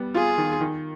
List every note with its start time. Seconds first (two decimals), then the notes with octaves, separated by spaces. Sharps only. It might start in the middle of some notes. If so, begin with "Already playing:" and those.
Already playing: G3 B3
0.14 F4 G#4
0.38 D#3
0.60 D#3